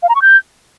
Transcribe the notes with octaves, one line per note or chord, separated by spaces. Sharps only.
F5
A#5
C#6
G6